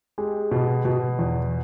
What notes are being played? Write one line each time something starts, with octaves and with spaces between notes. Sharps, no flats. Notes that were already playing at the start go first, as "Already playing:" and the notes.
G#3 G4
B2
B2
E2